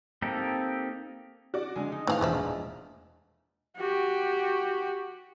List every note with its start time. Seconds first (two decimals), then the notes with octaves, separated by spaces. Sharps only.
0.22 A#3 C4 D#4 G4 A4
1.54 F#4 D5
1.76 D3 G#3 G#4 G#5
1.92 D#4
2.07 A2 D#3 E3 C4 G#4 F5
2.21 E1 A#1 D3 F3 E5
3.77 F#4 G4